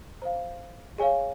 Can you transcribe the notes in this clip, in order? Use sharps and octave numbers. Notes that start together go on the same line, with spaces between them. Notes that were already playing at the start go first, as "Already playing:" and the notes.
C5 F5 A#5
G#4 C#5 F5 G#5